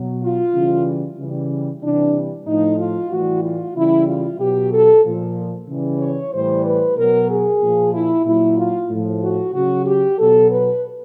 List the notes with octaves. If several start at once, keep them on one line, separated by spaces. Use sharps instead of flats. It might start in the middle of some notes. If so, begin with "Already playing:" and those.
Already playing: B2 F#3
F4
C#3 E3 G3
C#3 E3 G3
C3 E3 G3 D4
A2 F3 D#4
F4
A2 E3 G3 F#4
F4
C#3 E3 G3 E4
F4
B2 F#3 G4
A4
A#2 F3
C#3 E3 G3
C#5
A2 E3 G3 C5
B4
B2 F#3 A#4
G#4
A#2 F3
E4
A#2 F#3 E4
F4
A2 F3
F#4
C#3 F#3 F#4
G4
B2 F#3 A4
B4